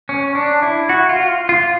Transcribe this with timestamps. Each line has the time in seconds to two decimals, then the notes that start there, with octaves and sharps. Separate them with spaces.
0.09 C#4
0.35 D4
0.63 E4
0.89 F#4
1.09 F4
1.49 F4